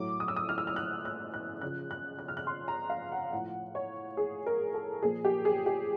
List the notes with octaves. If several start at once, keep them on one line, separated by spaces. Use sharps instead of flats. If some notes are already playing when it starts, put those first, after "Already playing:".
Already playing: A2 F#3 D6
D#6
E6
D#6
F6
E6
F6
F#6
F#6
F#6
C#3 F3 F#6
F#6
F#6
F6
F#6
C6
A#5
F5
F#5
A2 F3 F#5
C#5
G#4
A#4
A4
A#2 F3 G#4
G4
G#4
G4